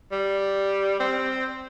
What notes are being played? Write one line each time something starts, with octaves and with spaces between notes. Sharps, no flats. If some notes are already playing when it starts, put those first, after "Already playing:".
G3
C4